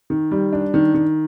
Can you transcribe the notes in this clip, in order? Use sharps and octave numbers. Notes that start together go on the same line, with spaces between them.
D#3
G3
D4
D#3
D#3